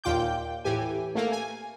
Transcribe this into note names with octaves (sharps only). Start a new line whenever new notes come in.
D#2 A#2 F4 G5 D6 G6
A2 E3 G4 G#5
A3 A#3
G#5